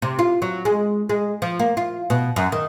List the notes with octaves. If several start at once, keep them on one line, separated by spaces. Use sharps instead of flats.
C3
F4
F#3
G#3
G#3
F3
A#3
F4
B2
F#2
D#3